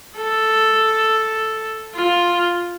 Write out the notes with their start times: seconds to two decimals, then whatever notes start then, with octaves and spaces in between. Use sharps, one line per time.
0.17 A4
1.95 F4